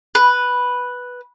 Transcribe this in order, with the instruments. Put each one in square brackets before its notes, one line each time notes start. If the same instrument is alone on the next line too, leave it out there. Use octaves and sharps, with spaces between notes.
[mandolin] B4